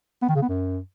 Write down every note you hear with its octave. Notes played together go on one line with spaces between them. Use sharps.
B3
D#3
C#3
B3
F#2